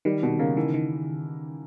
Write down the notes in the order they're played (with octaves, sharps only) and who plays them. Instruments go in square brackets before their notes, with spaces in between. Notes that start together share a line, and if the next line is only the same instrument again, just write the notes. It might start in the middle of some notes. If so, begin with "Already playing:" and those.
[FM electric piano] D#3 [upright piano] G3
[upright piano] B2 [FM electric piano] D#3
[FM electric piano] C#3 [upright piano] A#3
[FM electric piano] D#3 [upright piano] E3
[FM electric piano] D#3